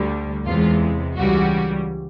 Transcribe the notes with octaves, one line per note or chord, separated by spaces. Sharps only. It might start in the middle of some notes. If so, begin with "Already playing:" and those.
Already playing: D2 D3 G3
E2 C3 E3 G#3 F4
C#2 C#3 E3 G3 F#4